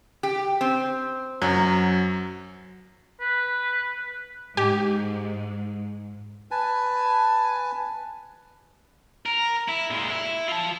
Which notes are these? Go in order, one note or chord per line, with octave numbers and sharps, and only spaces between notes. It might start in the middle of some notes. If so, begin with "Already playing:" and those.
G4
C4
F#2 F#3
B4
G#2 G4
B4 G#5 A5
A#4
E4
A#2 G#3
E4
F4 A5